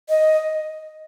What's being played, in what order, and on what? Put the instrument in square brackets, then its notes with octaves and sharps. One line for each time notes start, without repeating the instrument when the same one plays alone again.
[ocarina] D#5